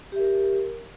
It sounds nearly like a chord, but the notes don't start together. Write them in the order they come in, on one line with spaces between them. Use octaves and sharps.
G4 E5 A#4